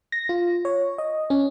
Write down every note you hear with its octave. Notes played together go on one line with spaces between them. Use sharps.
A#6
F4
C#5
D#5
C#4